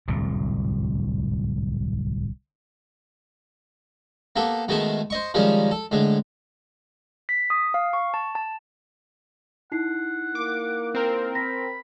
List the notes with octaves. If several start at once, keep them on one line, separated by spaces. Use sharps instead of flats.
D1 C2 F2 G#2
A#3 B3 G4 A4
B2 D#3 G#3 A3 A5
C5 D#5 C#6
D#3 F3 G3 G#3 C#4 D#4
A4
A2 D3 G#3
B6
D#6
F5
C#6
A5
A5
D#4 E4 F#5 C7
A#3 D6
C4 A#4
B5 A#6